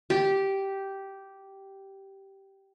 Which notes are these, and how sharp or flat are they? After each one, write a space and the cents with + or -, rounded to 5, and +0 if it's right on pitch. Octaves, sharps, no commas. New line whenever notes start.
G4 -10